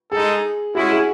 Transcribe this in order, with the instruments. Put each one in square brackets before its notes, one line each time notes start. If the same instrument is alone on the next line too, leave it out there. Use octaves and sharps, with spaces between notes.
[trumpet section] G#3 D#4 A4 [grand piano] G#4
[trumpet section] G#3 C#4 E4 [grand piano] F#4
[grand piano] G#4